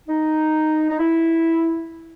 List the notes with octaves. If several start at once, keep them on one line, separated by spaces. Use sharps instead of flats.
D#4
D#4
E4